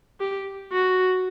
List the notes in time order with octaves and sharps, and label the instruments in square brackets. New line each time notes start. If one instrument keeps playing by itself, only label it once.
[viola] G4
F#4